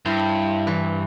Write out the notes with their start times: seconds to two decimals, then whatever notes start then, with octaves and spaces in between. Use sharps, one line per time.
0.06 G2 E4 C5
0.67 E3